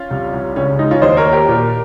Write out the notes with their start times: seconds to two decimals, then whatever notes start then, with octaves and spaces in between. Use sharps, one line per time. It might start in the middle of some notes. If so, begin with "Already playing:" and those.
Already playing: C#4 F4
0.11 C2
0.34 C2
0.56 C#2 C#4
0.79 G#3 D#4
0.91 C#4 F4
1.02 D#2 C5 D#5
1.17 A#4 C#5
1.25 A#3
1.33 G4 A#4
1.48 A#2